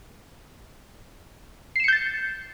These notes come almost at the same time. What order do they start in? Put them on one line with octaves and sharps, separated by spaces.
C7 E7 C#7 G6 A6